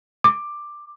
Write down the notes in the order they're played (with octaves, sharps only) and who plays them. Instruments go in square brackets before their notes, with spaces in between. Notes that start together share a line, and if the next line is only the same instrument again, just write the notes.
[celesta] D6